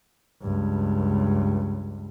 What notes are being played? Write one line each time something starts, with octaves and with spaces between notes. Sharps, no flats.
C#2 G2